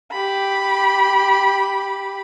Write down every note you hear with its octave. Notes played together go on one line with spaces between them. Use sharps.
G4 B5